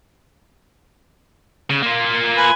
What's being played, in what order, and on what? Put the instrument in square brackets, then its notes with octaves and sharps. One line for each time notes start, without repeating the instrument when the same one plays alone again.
[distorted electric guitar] C#3
A#3 F4
[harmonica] B4 G#5